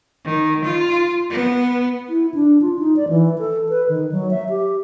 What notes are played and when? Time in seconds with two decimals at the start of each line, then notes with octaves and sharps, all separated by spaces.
0.25 D#3
0.64 F4
1.30 B3
2.09 E4
2.34 D4
2.62 F4
2.79 D#4
2.96 D5
3.09 E3
3.39 A4
3.69 B4
3.89 D#3
4.12 F#3
4.31 E5
4.49 G4